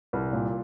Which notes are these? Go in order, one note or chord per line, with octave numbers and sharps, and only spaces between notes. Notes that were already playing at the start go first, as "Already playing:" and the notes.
C2
A#2